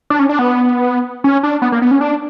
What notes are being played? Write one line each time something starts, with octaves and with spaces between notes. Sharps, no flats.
D4
C#4
D4
B3
C#4
D4
B3
A#3
B3
C#4
D4